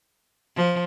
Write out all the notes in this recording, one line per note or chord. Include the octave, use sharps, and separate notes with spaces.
F3